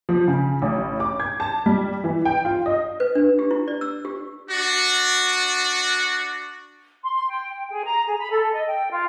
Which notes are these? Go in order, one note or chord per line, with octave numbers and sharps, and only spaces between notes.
F3
C#3
A1
D6
G#6
A5
G3
E3
G5
F4
D#5
B4
D4
G4
E4
D5
E6
G4
D4 F#4
C6
C6
G5
G5
G#4
A#5
G#4
B5
A4
D#5
G5
F4